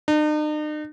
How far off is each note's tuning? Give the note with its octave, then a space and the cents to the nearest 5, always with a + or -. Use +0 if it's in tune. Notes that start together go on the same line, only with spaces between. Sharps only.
D#4 -45